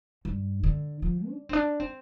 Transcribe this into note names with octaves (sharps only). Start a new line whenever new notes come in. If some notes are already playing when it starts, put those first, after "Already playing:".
G2
D3
F3
D4
C4
D4
C4